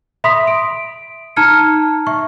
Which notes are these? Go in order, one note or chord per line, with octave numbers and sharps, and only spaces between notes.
E5 B5 C6 D#6 B6
D7
D#4 A5 A#5 F6 G#6 C#7
E5 C#6